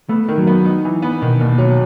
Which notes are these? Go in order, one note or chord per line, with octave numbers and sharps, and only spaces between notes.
A3 B3
D#3
F#3
B3
D#4
E3
B3
B2 D#3
D#2
F#3